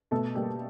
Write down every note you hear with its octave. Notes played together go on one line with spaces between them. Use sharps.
B2 A3 A4
G3 A#3 G4